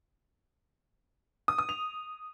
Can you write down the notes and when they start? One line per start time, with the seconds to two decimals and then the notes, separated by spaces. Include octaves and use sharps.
1.48 D#6
1.58 D#6
1.69 F7